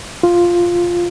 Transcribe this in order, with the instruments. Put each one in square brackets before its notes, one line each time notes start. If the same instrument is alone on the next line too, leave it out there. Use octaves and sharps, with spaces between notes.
[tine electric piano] F4